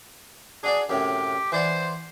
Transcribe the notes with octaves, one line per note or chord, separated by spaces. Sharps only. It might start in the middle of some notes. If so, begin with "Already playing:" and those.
D4 F#4 G#4 D5
F#2 A2 C3 G4
E3 C5 D5 F#5